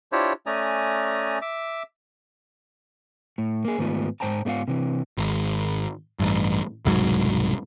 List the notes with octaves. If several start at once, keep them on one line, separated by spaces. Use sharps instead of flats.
D4 E4 F4 G4 C5 C#5
A3 C#4 D5 G#5 A#5 D#6
E5 D6
A2
A#3 G#4
G#2 D#3 A3 B3 D#4 F4
G#2 C5 G5 A5 A#5
G#2 A3 B3 F4 F5 F#5
C3 E3
G#1
A1 G2
E1 C2 G#2 F#3